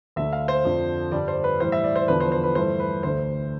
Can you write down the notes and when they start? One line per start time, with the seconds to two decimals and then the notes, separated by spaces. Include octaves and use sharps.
0.16 D2 D3 A3 E5
0.33 F5
0.48 C5
0.65 F2 D3 F3
1.12 G2 D3 G3 D5
1.28 C5
1.44 B4
1.60 A2 E3 G3 C5
1.72 E5
1.84 D5
1.96 C5
2.08 E2 D3 F3 B4
2.20 C5
2.32 C5
2.44 B4
2.55 G2 E3 A3 C5
2.80 B4
3.03 D2 D3 A3 C5